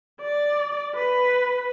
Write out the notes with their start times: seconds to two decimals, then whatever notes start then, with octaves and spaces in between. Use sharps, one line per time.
0.21 D5
0.95 B4